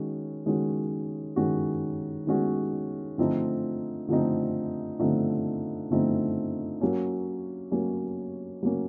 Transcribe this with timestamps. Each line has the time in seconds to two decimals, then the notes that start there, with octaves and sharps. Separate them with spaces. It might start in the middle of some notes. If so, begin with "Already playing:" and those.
Already playing: D#3 G#3 C#4 F#4
0.46 D#3 G#3 C#4 F#4
1.36 D#3 G#3 C#4 F#4
2.27 D#3 G#3 C#4 F#4
3.18 D3 F3 A3 C4 D#4
4.08 D3 F3 A3 C4 D#4
4.99 D3 F3 A3 C4 D#4
5.91 D3 F3 A3 C4 D#4
6.81 F#3 A#3 C#4
7.71 F#3 A#3 C#4
8.63 F#3 A#3 C#4